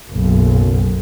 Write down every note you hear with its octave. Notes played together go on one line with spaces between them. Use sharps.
F#1 B1